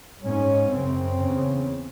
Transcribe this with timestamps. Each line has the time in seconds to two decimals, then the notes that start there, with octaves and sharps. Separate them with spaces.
0.24 G#2 C#4
0.72 F#2 C#3 C4
1.21 E2 C#3